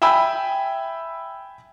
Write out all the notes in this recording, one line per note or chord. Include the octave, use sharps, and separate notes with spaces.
E5 G5 G#5 B5 E6